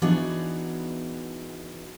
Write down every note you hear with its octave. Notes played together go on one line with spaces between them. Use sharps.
E3 B3 D4 D#4 F#4 G#4